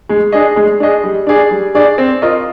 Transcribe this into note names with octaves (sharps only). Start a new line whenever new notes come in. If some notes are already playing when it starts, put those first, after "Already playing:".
G#3
D4 G#4 D#5
G#3
D4 G#4 D#5
G3
D4 G#4 D5
G3
D4 G#4 D5
C4
F4 A#4 D#5